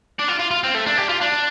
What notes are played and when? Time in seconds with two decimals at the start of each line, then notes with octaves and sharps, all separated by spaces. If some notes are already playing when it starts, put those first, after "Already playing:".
0.19 D4
0.28 F4
0.39 F4
0.51 F4
0.64 C4
0.75 A3
0.86 D4
0.98 G4
1.09 F4
1.21 D4